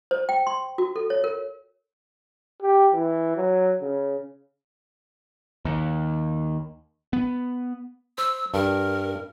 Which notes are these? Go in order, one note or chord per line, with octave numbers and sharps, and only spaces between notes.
C5
G5
C6
F#4
A4
C#5
A#4
G4
E3
F#3
C#3
D#2
B3
C5 E6
G2 A#4